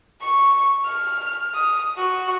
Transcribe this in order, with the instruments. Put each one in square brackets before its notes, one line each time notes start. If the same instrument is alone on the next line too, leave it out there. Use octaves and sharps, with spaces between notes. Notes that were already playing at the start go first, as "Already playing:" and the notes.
[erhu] C#6
F6
D#6
F#4